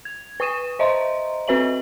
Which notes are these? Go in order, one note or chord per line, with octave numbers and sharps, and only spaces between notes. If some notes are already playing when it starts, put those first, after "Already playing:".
G#6
B4 C#6 D#6 D#7 E7
C5 D#5 E5 A#5 C6
C4 F#4 B4 C#5 E5 F#7